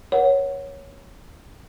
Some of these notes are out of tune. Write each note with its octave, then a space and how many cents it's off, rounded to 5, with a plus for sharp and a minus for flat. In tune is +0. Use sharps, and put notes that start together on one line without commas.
A#4 +45 C#5 +0 F#5 +0